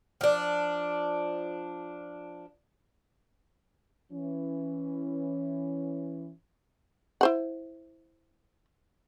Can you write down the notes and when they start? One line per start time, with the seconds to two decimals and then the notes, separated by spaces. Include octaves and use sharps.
0.21 F3 D4
4.12 E3 C#4
7.21 E4 C5 F#5